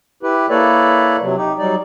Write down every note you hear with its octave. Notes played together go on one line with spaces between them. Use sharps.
E4 G4 B4
A#3 E4 A4 B4 C#5 D5
C3 F#3
D#4 G4
F#3 G3 D#4 D5